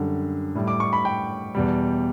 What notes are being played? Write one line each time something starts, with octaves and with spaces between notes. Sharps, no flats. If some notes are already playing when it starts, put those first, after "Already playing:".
Already playing: F#2 D3 G3
A2 G3
D6
C#6
B5
G5
E2 B2 G3